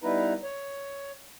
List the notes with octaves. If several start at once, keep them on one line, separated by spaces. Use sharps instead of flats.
G3 B3 D#4 E4 B4 A#5
C#5